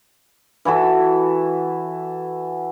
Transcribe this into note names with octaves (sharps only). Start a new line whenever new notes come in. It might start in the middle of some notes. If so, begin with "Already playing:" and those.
E3 E4 F#4 A4